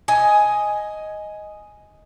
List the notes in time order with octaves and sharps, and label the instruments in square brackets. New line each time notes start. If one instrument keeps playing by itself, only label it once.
[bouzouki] D#5 G#5